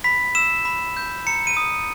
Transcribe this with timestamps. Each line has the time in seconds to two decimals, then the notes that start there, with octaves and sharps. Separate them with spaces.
0.04 B5 B6
0.35 E6 E7
0.65 B5
0.97 G6
1.27 A#5 C#7
1.47 D#7
1.57 D#6